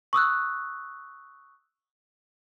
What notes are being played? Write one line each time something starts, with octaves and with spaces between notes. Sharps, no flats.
C#6 D#6 E6 F#6